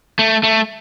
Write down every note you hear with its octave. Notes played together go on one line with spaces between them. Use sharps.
A3
A3